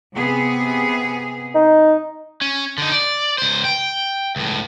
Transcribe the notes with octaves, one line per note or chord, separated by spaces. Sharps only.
C3 B3 G#4
D#4
C#4
D3 D#4
D5
C#2 C5
G5
C#2 A2